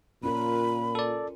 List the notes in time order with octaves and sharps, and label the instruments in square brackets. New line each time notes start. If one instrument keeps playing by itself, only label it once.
[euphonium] A#2 [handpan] C#4 F4 A#4 [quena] B5
[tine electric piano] A4 D5